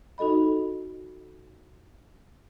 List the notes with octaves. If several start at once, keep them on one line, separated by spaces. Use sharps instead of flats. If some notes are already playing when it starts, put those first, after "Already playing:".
D#4 F#4 A4 D#5 B5